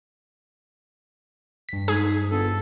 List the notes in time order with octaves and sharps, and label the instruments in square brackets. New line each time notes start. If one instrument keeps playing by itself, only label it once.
[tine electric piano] G2 B6
[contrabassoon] G#2 [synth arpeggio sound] G#4
[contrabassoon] G1 [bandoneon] A4